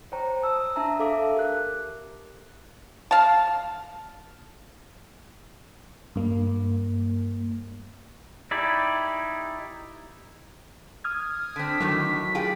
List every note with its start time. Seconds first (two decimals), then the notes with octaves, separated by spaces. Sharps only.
0.12 C5 C#5 G5 A#5
0.42 A5 D#6 E6
0.76 D4 E5 A5 A#5
1.00 A4 E5 F5 D6
1.35 G4 A#4 F#6
3.11 F5 A5
6.16 G2 A#3
8.51 D#4 E4 G4 D5 G#5
11.04 D#6 F6 G#6
11.56 D3 C4 B6
11.80 F2 A2 D#3 F#3
12.35 F4 G4 G#4